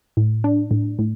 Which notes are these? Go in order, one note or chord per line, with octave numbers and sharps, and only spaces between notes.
A2
D4
A2
A2